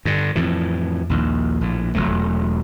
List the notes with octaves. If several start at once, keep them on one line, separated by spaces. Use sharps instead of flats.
G2 D3
F2 A2 E3
A#1 D#2
A#1 A2
E1 F#3 A3